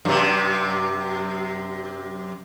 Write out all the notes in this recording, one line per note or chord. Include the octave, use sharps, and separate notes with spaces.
F#2 C3